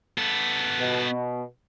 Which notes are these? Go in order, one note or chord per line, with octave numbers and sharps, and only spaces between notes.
B3 A4
B2